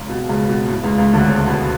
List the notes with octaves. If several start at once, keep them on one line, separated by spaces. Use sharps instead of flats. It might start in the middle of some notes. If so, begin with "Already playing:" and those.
Already playing: C#2 C#3
B2
C#2 C#3
B2
A2
C#2 C#3
C#2 C#3
D2 D3
C#3 C#4
B2 B3